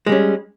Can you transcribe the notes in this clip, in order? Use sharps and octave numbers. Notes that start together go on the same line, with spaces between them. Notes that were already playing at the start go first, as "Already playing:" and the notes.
G3 G#3 C#4